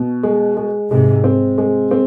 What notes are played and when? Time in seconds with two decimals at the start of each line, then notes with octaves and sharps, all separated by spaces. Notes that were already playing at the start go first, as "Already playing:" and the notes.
Already playing: B2
0.23 G#3
0.57 G#3
0.90 G#2 C3 G#3
1.24 C4
1.58 G#3
1.91 C4